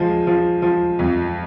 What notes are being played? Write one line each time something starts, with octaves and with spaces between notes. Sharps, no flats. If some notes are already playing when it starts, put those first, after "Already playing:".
Already playing: F3 G#3
F3
F3
F2